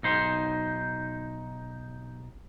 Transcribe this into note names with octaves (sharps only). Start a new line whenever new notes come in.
B1 D#4 C5